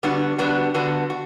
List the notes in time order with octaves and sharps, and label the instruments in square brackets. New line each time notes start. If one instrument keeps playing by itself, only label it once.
[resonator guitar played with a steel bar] D3 G3 B3 D4 F#4
D3 G3 B3 D4 F#4
D3 G3 B3 D4 F#4
F#4